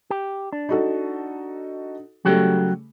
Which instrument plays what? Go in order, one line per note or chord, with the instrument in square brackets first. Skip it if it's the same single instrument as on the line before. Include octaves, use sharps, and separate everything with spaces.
[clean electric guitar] G4
D4
[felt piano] D#4 F#4 A4
[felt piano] C#3 G3 A3 [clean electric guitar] F#3 F#4 G5